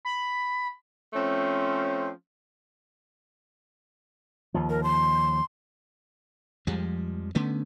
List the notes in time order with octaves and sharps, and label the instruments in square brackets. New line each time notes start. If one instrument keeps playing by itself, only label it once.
[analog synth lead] B5
[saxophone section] F3 A3 C4 C#4
[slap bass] D#2 F3
[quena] A#4
C6
[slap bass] F2 F3 G3 G#3
D3 A3 B3 C#4